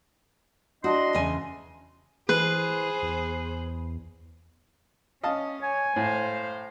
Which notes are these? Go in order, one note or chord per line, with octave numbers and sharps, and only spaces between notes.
D4 E4 F#4 D#5 C6
E2 C#3 G#5
E3 G#4 B4 C5
E2
C#4 D#5 F5 A5
C#5 G#5
A2 C5 F5